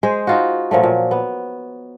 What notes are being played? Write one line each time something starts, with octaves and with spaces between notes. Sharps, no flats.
G#3 G#4 C5
D#4 F4 F#4
A#2 F3 F#3 A3
A#2
B3